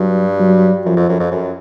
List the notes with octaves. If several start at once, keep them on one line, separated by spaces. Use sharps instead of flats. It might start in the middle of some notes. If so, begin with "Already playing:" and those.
Already playing: G2 F#3
F#3
F#2 F3
F2
F#2
F2
F#2